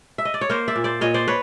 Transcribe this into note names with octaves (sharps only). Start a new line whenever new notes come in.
E5
D#5
D5
C#5
A#3 A#4 C5
D5 E5
A#2
C5 D5
A#2 C#5 D#5
C5 D5
B4 C#5